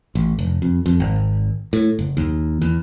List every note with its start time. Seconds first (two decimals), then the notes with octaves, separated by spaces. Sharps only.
0.15 A1
0.39 F1
0.62 F2
0.86 F2
1.00 G#1
1.73 A2
1.99 F#1
2.17 D#2
2.62 E2